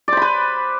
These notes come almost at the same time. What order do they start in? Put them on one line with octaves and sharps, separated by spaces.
D5 C5 B5 B4